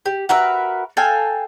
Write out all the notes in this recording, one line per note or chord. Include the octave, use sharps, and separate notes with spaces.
G4
F#4 A#4 B4 E5
A4 F5 G5 G#5